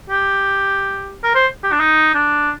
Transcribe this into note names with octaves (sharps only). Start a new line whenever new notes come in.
G4
A#4
C5
G4
D4
D#4
D4